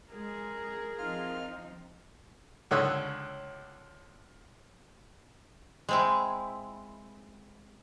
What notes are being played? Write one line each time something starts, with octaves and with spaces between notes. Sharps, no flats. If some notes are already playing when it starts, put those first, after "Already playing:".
G#3 G#4 A#4
F3 C4 D#4 F4 F6
C#2 D3 C#5 D#6 E6 F#6
G#3 C4 E4